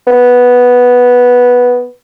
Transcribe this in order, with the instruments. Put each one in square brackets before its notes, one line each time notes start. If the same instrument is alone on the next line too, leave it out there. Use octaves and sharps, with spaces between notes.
[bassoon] B3